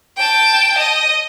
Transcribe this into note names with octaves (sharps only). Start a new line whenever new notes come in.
G5 A5
D#5